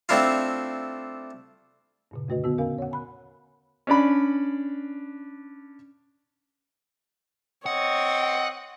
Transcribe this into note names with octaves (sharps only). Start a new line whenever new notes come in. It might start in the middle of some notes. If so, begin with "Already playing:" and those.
A3 C4 D4 E4 F4
G2 A#2 C#3
F2 D3 A3 F#4 B4 D#5
E2 D3 B3 F#4 E6
C#4 A#4 F5 G#5
C#5 F#5
G#5 B5 F#6
C#4 D4 D5 B5
C4 C#5 D#5 F#5